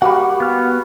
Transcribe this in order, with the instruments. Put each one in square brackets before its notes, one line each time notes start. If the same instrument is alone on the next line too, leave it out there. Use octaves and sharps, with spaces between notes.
[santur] G3 A#3 F#4 [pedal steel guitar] F#5
[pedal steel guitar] B3 F6